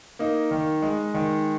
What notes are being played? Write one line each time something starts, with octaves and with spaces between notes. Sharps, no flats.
A#3 D#4
D#3
G#3
D#3